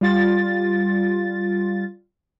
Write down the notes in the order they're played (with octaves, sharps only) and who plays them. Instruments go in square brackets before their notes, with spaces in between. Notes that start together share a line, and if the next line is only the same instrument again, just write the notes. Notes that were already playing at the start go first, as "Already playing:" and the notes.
[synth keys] G3 F4 A6